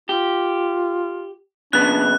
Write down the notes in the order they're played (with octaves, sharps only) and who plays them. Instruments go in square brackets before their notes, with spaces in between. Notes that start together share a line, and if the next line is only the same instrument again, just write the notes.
[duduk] F4 [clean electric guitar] G4
[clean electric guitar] F#2 C#3 B3 [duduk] D4 [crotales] F#6